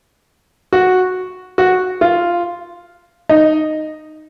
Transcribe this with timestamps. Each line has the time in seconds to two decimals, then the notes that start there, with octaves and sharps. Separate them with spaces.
0.73 F#4
1.58 F#4
2.01 F4
3.29 D#4